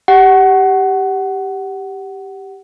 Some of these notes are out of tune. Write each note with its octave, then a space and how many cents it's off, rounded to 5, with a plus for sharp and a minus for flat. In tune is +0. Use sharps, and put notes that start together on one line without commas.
G4 +0 F#5 +20